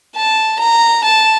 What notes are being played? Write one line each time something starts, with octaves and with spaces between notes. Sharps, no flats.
A5
A#5
A5